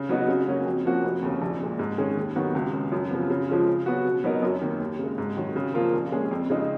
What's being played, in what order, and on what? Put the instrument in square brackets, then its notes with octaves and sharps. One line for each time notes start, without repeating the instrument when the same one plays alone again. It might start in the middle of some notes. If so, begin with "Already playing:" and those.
Already playing: [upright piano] C#3
F#3 B3 D#4 F#4
C#3
F#3 A#3 C#4 F#4
F2
F3 A#3 C#4 F#4
F1
D#2 C#3
A#1
A#2 G#3
G#2
D#3 G#3 C#4 G#4
D#2
D#3 F#3 B3 F#4
C#2
C#3 G#3
F#2
C#3 F3 B3
C#3
F3 G#3 C#4 F4
C#3
F#3 B3 F#4
B2
F#3 B3 D#4 A#4
F#2
D#3 A#3
D#2
C#3 G#3
G#2
D#3 F#3
C#3
F3 A#3 F4 A#4
A#1
A#2 G#3 C#4 G#4
F2
C#3 G#3 D#4